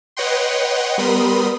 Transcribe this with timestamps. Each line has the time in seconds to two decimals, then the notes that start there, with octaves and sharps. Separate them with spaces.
0.17 B4 C#5 D#5 F#5 G5 C6
0.98 G3 B3 A#4 B5 C6 D#6